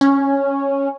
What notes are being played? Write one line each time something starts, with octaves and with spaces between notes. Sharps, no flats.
C#4